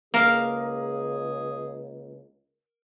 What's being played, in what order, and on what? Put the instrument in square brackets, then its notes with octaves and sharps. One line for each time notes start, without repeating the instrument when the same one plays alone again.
[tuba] C#2 [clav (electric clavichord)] A#3 [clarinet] G#4 [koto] A#4 F5